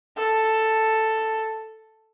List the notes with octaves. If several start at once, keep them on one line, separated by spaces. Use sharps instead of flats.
A4